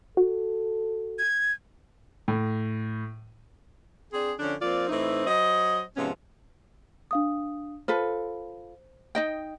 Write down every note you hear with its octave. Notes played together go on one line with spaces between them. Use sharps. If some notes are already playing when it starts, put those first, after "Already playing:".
F#4 A4
G#6
A2
C4 D4 G#4
D3 F3 C#4 D4
F3 A#3 C4 F4 D5
A2 E3 C4 D#4
F#3 C5 D#5
G#2 C3 F3 B3 C#4
D4 F5 D#6
F4 A4 B4 C5
D#4 D#5 G5